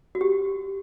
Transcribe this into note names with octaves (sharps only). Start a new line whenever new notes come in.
F#4
G4